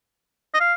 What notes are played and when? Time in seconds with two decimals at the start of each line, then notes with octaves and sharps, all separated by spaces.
0.54 D#5
0.60 F5